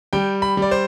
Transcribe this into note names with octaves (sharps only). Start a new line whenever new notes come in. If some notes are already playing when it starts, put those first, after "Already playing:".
G3 G5
B5
G3 D5
C5